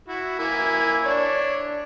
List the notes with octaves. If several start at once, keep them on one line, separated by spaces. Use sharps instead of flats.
E4 F#4
A#3 E4 G#5
D4 C#5 D5